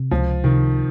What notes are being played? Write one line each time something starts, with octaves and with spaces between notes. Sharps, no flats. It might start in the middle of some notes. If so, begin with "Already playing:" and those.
Already playing: C3
C#2 F3
C3 D#3